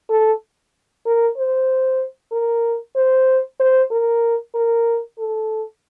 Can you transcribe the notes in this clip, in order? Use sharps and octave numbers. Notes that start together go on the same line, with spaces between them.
A4
A#4
C5
A#4
C5
C5
A#4
A#4
A4